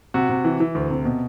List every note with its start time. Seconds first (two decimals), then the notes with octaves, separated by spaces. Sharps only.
0.14 C3 F#4
0.29 C3
0.45 E3
0.60 E3
0.75 D2
0.90 C3
1.05 B2